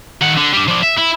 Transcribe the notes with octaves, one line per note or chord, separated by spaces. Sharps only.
D#3 F#5
D3
G3 D4
F3 D4
E5
E4